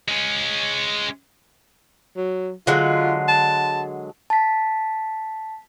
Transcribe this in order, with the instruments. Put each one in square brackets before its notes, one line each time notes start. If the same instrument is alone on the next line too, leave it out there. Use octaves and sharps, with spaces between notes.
[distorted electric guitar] G#3 C#4
[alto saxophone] F#3
[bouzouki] D3 F#3 G#3 [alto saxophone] F4
[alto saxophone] A5
[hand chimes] A5 B6